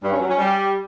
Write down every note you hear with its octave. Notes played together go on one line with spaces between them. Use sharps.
G2
C#4
F#3
C#4
G3